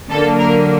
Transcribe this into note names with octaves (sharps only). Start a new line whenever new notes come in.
D3 F#3 A#3 A4
A#4